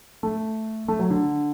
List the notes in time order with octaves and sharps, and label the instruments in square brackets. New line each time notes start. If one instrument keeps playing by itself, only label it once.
[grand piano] A3
A3
F#3
D3